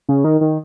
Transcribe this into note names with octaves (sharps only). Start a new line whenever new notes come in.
C#3
D#3
D#3